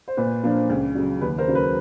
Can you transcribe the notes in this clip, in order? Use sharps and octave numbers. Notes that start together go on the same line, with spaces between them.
C5
A#2 B4
F3 A#3 D4
C#2
C#3 F#3
D#2 B4
A#4 C5
C#3 F#3
B4